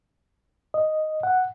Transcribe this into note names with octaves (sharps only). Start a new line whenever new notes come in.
D#5
F#5